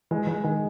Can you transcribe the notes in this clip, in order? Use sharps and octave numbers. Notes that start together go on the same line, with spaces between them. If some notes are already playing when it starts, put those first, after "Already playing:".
E3 G#3
E3 G#3
D#3 G#3